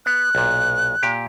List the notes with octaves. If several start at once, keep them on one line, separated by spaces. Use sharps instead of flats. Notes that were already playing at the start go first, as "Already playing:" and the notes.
B3 F#6
B1 A#2
A#2 G4